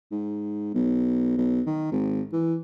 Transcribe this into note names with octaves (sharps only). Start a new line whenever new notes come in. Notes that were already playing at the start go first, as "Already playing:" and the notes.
G#2
B1
B1
D#3
G#1
E3